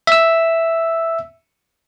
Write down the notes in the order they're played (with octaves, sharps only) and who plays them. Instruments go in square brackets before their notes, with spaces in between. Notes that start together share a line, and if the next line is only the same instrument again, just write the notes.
[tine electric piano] E5 E6